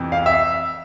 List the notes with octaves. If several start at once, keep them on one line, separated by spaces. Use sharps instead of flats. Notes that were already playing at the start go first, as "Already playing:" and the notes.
Already playing: F2 C3 E3
F5
E5